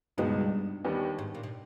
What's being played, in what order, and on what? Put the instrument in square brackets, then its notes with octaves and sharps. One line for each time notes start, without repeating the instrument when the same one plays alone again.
[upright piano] C#2 B2 G#3 B3 D#4 [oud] G2
[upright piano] D#2 D#3 G3 B3
[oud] G#2
A#2
B2